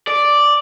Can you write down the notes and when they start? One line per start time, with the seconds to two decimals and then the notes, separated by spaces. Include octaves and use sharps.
0.08 D5